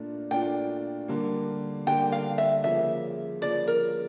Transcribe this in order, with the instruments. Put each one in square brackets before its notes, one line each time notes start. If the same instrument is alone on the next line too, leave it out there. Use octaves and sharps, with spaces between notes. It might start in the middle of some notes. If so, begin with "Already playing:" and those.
Already playing: [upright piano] A#2 A3 D4 F4
[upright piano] A#2 A3 D4 F4 [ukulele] G5
[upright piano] D3 G3 A#3
[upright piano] D3 G3 A#3 [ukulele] G5
[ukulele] F5
E5
[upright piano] C#3 F3 A#3 [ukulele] E5
[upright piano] C#3 F3 A#3 [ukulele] D5
[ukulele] A#4